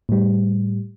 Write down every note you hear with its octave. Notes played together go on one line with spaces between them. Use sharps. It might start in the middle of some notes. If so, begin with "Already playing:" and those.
A2 G3